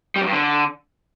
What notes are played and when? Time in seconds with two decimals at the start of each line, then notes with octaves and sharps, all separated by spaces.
0.16 G3
0.21 F#2
0.27 G2
0.33 D3